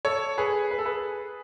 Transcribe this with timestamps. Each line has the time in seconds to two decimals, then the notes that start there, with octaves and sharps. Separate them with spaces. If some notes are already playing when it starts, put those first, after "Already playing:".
0.05 A4 C#5
0.38 G#4 B4
0.71 B4
0.78 A4
0.86 G#4 B4